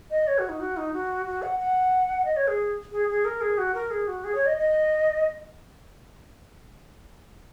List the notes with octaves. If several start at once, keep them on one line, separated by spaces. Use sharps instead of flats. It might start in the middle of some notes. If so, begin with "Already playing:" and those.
D#5
C#5
F#4
D#4
F#4
D#4
F#4
F#4
F#5
F#5
D#5
C#5
G#4
G#4
G#4
A#4
G#4
F#4
A#4
G#4
F#4
G#4
C#5
D#5
D#5